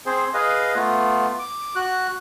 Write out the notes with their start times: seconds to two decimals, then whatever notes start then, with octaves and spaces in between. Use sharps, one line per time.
0.06 C4 G#4 C5
0.34 G#4 B4 D#5 F5
0.75 A3 B3 F4
1.39 D6
1.76 F#4 F#6